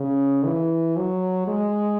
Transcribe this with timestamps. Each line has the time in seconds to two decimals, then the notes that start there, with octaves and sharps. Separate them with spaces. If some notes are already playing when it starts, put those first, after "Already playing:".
Already playing: C#3
0.45 E3
0.97 F#3
1.48 G#3